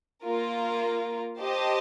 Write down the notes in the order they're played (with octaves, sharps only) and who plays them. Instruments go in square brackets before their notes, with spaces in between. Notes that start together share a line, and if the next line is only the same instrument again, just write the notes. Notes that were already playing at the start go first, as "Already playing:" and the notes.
[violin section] A#3 F4 A#4
G4 C5 D#5 A5